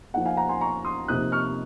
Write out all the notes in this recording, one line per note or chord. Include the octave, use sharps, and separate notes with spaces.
F3 A#3 D#4 F#5
F5 G#5
F#5 A#5
G#5 C6
A#5 C#6
C6 D#6
C3 F3 A#3 D#4 D#6 F#6
C#6 F6